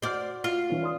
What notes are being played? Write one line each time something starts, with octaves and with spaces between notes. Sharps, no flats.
F#4 C5 D5 F#5 F6
F4
E3 C#4
D5 C6 D#6